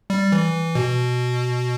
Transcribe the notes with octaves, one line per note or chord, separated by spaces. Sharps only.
G3
E3
B2